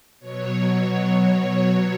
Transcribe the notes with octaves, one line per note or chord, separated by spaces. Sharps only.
B2 F#3 C#5